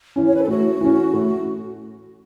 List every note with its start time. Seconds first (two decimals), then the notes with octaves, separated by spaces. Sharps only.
0.16 E3 C#4
0.27 C#5
0.34 B4
0.42 A4
0.48 A2 F#4
0.81 E3 C#4
1.13 A2